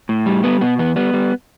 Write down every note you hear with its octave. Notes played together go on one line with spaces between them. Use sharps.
A2
G3
G3 B3
B2 B3
E2 B3
G3 B3
G3